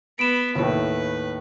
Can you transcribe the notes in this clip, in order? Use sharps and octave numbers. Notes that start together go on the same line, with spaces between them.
B3 B5 D7 E7
D#2 A2 B4